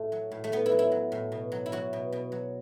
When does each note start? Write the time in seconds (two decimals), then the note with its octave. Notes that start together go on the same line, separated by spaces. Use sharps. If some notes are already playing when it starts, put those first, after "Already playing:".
Already playing: A2 A3
0.12 F#3
0.32 A2
0.44 A3
0.52 A2 B3
0.66 E4
0.72 F#3
0.79 E4
0.92 F#3
1.12 A2
1.32 B2
1.52 F#3
1.66 E4
1.72 F#3 F#4
1.93 B2
2.12 B2
2.32 F#3